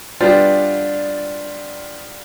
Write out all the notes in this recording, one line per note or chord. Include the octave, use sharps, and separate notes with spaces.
G3 B3 D4 F4